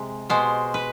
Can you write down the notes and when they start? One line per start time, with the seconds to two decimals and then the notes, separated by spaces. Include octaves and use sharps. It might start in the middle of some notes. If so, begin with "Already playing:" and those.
Already playing: C3 G#3
0.30 B2 G#3 C5
0.74 B4